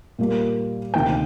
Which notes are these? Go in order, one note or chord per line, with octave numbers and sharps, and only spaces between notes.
A#2 G3 A#3
D2 C3 D#3 A#3 G5